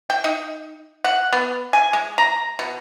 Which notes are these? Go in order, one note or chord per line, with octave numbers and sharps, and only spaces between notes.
G5
D#4
F#5
B3
G#5
G#3
A#5
B2